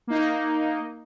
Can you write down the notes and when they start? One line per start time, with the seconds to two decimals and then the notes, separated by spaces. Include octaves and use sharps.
0.07 A#3 D#4